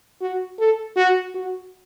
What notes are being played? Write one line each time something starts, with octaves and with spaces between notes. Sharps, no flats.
F#4
A4
F#4
F#4